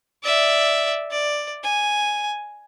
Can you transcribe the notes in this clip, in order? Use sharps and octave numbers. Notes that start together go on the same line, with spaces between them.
D5 E5
D5
G#5